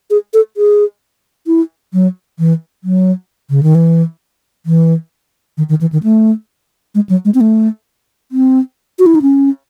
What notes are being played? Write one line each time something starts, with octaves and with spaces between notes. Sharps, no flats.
G#4
A4
G#4
E4
F#3
E3
F#3
C#3
D#3
E3
E3
D#3
D#3
E3
D#3
A3
G#3
F#3
G#3
C4
A3
C4
F#4
E4
D#4
C#4